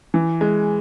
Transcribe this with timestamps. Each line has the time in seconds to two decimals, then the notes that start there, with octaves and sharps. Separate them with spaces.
0.14 E3
0.41 G#3